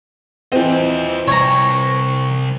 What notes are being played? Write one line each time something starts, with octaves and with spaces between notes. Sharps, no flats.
E3 C4 F4 D#5
C3 G3 C#5 A#5